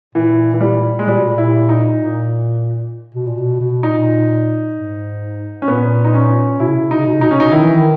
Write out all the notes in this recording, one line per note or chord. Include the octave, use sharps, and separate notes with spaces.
A#2 E3
E3
G3
G#3
A#2 G3
B2
A#2
E4
D#4
A#2
B2
A#2
B2
B2
A#2 D#4
G#2
C#4
A#2 B3
D#4
C#4
B2 E4
C#3
B2
C#3
B2 D#4
C#3
B2
C#3
B2 D#4
C#3 C#4
B2 D#4
D#3 E4
E3
D#3